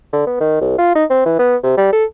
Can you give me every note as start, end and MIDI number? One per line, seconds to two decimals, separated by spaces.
0.13 0.26 50
0.27 0.37 59
0.40 0.59 51
0.61 0.77 36
0.78 0.95 65
0.95 1.05 63
1.10 1.21 60
1.26 1.36 52
1.39 1.57 59
1.63 1.77 48
1.77 1.92 55
1.93 2.05 69